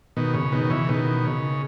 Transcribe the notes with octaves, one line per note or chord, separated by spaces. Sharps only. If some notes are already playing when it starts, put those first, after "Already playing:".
B2 D#3
C#3
B2 D#3
C#3 E3
B2 D#3
C#3